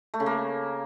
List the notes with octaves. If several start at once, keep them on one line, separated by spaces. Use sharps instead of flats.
A3
C#3
A#3